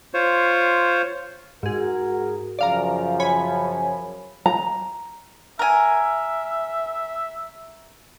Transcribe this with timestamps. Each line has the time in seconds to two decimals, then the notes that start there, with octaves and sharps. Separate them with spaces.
0.14 F4 C5 C#5
1.63 G#2 F#4 G#4 A#4
2.59 F#2 C#3 F3 D5 F5 A#5
3.20 C#5 G#5 B5
4.46 A#5
5.59 A#4 E5 G#5